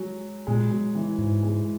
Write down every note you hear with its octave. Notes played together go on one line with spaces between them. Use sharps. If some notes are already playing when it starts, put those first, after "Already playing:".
Already playing: F#3 G#3
A#2 G#3
F#3
E3
G#2
G#3